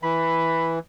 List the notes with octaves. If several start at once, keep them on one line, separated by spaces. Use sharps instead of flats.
E3 B5